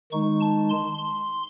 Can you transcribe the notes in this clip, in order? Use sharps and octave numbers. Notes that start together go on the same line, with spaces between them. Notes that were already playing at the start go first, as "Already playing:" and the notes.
D#3 G#3 D#4 C#6
A5
C6
C6